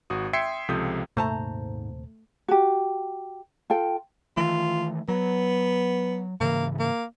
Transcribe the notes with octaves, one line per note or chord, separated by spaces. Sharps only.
G#1 F#4 D#6
E5 G5 C6 G#6 C7 C#7
C#2 C3 F3 A4 D#6 G6
D#1 G#2 C3 A3 A#3 C5 A5 A#5
F#4 G4
F4 A4 G5
D#3 E3 A3 F4
F#3 B3
G#2 C#3 E3 A#3
A#3